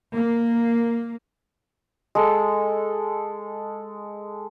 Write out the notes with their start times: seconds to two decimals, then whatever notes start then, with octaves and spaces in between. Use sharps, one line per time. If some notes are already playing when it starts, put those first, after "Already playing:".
0.13 A#3
2.15 G#3 A4